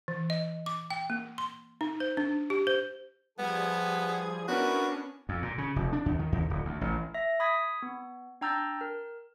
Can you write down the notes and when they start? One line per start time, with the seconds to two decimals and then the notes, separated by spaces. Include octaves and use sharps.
0.08 E3
0.30 D#5
0.66 D6
0.90 G5
1.10 A#3
1.38 C6
1.81 D#4
2.00 C5
2.17 D4
2.50 G4
2.67 C5
3.39 F3 G3 B3 G#4 G#6
4.48 B3 C#4 D4 E4 F#4 A#4 B4
5.29 F2
5.42 A#2
5.58 C#3
5.76 F1
5.93 D4
6.06 D#2
6.19 D#3
6.32 D#2
6.50 D1
6.65 D2
6.81 A1
7.14 E5 A#6
7.40 B5 D#6 G#6 B6
7.82 B3
8.41 D4 G5 A#5 E6 G6 A6
8.81 A#4